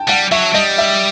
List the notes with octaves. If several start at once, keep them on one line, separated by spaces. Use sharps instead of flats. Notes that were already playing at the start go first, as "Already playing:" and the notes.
Already playing: G5 A5
G3 F#5
F#3 E5
G3 D#5
E5